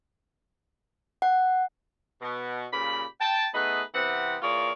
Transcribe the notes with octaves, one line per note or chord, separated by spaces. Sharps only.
F#5
B2
A#2 C#3 G4 B5
G5 A5
A3 B3 D#4 G#4 B4
C3 E3 B3 C4 F#5
E3 A#3 F4 G#4 C#5 D5